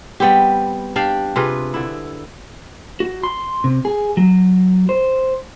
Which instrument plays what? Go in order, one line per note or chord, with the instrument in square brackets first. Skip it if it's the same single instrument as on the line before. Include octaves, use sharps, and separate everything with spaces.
[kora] G3 B3 C4 G4
D4 G4 D5 F5
C3 F4 G#4 B4
D3 E4
[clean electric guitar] F#4
C6
C3
G#4
F#3
C5